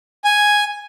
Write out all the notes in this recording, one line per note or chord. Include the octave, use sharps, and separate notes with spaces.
G#5